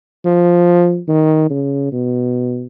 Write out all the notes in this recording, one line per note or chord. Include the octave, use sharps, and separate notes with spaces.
F3
D#3
C#3
B2